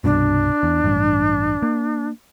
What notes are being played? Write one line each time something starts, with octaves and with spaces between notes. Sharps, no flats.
C2 G2 B2 D4
E2
A1 G2
A#3